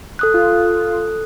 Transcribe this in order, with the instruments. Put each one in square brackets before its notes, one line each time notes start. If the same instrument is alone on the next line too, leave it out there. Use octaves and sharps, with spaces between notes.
[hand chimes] A4 D#6 F#6
[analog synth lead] F4